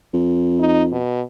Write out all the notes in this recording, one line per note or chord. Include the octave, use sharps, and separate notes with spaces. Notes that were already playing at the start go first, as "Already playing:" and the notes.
F2
D#4
B2